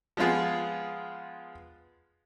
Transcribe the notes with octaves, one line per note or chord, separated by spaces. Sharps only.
F3 G#3 B3 F4 G#4